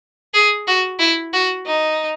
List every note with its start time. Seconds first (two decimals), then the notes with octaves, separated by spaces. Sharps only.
0.34 G#4
0.67 F#4
0.99 E4
1.33 F#4
1.67 D#4